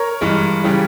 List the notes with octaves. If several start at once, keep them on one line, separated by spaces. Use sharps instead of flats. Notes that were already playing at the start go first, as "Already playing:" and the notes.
Already playing: A#4 C#5
G2 E3 G#3
C#3 E3 G3